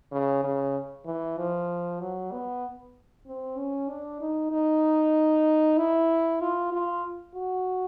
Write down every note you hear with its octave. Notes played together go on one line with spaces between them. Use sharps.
C#3
C#3
E3
F3
F#3
B3
C4
C#4
D4
D#4
D#4
E4
F4
F4
F#4